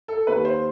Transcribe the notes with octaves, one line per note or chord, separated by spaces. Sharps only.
A4
D#2 B4
C5